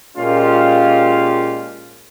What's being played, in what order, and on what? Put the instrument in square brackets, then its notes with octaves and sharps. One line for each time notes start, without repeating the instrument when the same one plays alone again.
[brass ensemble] A#2 G#3 C#4 F4 G4 F5